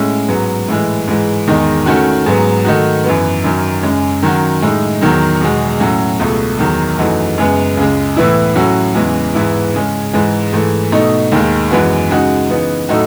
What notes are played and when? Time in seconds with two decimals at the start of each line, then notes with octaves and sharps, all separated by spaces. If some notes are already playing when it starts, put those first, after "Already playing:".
Already playing: A2 G#3 C#4
0.28 G#2 F#3 B3
0.68 A2 E3 G#3
1.07 G#2 E3 G#3
1.47 E2 D#3 G#3 D#4
1.86 D#3 A3 C#4 F#4
2.26 G#2 F#3 B3
2.65 D#3 A3 D#4 F#4
3.04 F#2 E3 B3
3.44 F#2 D#3 F#3
3.83 F#2 C#3 G#3 C#4
4.23 D#3 F#3 C#4 F#4
4.62 A2 G#3 D#4
5.01 E2 D#3 F#3
5.41 E2 B2 G#3
5.80 A2 F#3 C#4 F#4
6.19 C#2 B2 A3
6.59 E2 D#3 F#3
6.98 F#2 E3 A3 D#4 F#4
7.38 F#2 C#3 G#3 B3
7.77 C#2 C#3 G#3
8.16 A2 E3 B3 E4
8.56 A2 F#3 C#4 F#4
8.95 E2 C#3 E3 G#3
9.34 G#2 E3 B3 E4
9.74 C#3 G#3 C#4
10.13 G#2 E3 G#3
10.53 G#2 E3 A3
10.92 B2 A3 D#4
11.32 D#2 D#3 G#3
11.71 F#2 E3 G#3 B3 F#4
12.10 C#3 G#3 D#4 F#4
12.50 C#3 E3 B3 D#4
12.89 A2 F#3 A3 D#4 F#4